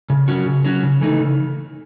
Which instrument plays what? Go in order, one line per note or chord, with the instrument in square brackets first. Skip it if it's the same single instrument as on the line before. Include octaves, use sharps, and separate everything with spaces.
[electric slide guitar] C#3
F#3 C#4 F#4
C#3
F#3 C#4 F#4
C#3
E3 A3 D#4
C#3